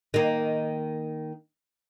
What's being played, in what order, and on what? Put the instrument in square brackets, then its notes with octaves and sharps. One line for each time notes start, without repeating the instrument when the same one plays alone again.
[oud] D#3 A#3